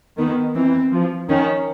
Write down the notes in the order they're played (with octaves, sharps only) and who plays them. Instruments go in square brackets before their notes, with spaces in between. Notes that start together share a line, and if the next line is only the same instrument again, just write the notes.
[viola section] D#3 [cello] B3
[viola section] E3 [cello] C4
[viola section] F3
[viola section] D#3 [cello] C#4